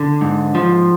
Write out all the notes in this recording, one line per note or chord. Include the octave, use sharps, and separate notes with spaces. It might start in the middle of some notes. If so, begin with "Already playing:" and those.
Already playing: D3
G#2
F3